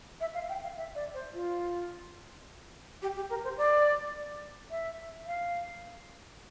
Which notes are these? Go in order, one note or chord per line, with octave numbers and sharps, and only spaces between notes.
E5
F5
G5
F5
E5
D5
C5
F4
G4
G4
A#4
C5
D5
E5
F5